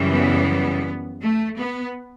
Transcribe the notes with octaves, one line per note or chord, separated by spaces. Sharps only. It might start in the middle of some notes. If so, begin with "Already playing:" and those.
Already playing: F#2 C#3 E3 G3
B3
A3
B3